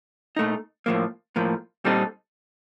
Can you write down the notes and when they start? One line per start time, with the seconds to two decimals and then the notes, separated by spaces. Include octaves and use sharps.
0.36 A#2 A3 D#4
0.86 A2 F3 A#3
1.36 A2 F3 A#3
1.85 A#2 G3 C4 D#4 A4